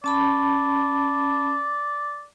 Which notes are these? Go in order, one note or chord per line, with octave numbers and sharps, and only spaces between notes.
C#4 D5 A5 B5